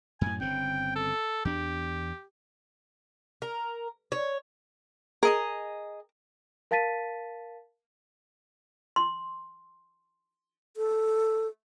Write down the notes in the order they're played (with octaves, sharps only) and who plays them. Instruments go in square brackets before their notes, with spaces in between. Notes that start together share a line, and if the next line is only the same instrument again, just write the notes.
[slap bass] F#2 A2 [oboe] G#5
[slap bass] G1 C#3 C4 [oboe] G5
[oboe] A4
[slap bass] E2 D4 [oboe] G4
[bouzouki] A#4
C#5
[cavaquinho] G#4 D#5 A#5 [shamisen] A#4
[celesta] A#4 F5 A5 A6 B6 D#7
[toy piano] C6
[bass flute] A4